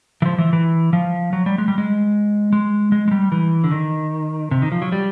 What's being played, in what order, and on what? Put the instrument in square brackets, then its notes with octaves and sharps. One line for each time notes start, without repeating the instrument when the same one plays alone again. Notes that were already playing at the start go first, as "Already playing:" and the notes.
[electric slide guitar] E3
F3
E3
E3
F3
F#3
G3
G#3
G3
G#3
G#3
G#3
G#3
G3
E3
D3
D#3
C3
D#3
F3
F#3
G3